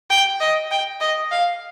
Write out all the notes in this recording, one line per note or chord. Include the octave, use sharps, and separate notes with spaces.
G5
D#5
G5
D#5
F5